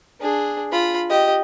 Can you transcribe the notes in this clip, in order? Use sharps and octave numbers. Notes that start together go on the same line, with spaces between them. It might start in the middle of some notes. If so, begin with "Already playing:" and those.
D4 G#4
F4 B5
G4 D#5